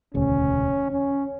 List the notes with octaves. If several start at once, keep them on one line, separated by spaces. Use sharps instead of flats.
E1 D2 C#3 C#4
C#4